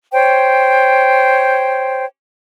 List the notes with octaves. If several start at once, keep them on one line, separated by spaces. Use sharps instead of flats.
C5 C#5 G5